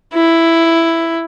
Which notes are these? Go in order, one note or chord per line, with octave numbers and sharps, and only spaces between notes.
E4